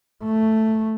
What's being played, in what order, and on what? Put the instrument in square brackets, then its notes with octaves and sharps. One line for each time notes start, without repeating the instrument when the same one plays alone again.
[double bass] A3